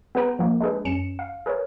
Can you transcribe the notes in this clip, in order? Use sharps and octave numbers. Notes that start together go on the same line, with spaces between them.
B3 G#4 B4 G5 A#5
F3 A#3
G#3 D4 G#4 B4
F#2 C#4 C#7 E7
F5
G#4 A#4 B4 C#5